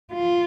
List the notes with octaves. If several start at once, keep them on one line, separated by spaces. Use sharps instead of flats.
F4